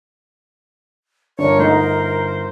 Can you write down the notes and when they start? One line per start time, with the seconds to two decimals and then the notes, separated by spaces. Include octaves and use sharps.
1.39 G1 D4 A#4 C#5
1.59 A3 D#4 C5